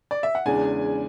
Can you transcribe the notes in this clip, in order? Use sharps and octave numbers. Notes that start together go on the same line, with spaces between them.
D5
E5
F#5
E2 C#3 E3 G#3 D4 G#5